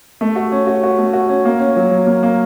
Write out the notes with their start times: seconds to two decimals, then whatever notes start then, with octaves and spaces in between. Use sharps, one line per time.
0.21 A3
0.36 F#4
0.52 C#4
0.67 F#4
0.83 F#4
0.98 A3
1.13 F#4
1.29 C#4
1.45 A#3
1.60 C#4
1.76 F#3
1.91 F#3
2.07 A#3
2.23 A#3